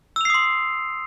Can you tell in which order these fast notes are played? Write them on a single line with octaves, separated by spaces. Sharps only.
E6 F7 C7 D#6 C6